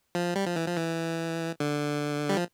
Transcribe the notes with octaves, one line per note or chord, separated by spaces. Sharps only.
F3
G3
F3
E3
F3
E3
D3
G3
F3